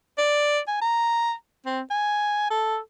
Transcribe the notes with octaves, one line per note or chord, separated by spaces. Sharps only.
D5
G#5
A#5
C4
G#5
A4